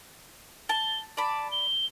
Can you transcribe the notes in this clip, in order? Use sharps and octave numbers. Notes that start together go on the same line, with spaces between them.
A5 G7
D5 A5 B5
G7